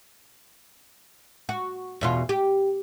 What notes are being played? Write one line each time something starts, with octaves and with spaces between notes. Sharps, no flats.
F#4
E2 B2 F4
G4